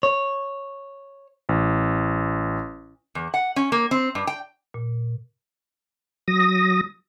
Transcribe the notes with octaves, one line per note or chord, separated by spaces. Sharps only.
C#5
A1
E2
F#5
C#4
A#3
C4
G2
G5
A#2
F#3 D#6 A#6